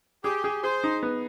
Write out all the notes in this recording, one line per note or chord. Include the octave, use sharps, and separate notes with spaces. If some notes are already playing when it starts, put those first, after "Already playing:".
G4 G#4
G#4
G#4 C5
D#4
B3